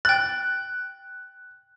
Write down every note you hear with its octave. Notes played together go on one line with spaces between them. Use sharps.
G5 F#6 A6